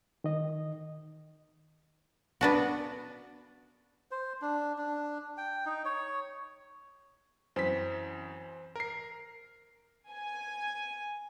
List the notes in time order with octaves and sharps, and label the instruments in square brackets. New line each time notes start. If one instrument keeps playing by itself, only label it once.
[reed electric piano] D#3 D#5
[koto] B3 D4 F#4
[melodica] C5
D4
D4
G5
D#4
C#5
[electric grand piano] F#2 B6 [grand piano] E3 C4
[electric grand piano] A#4 C7
[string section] G#5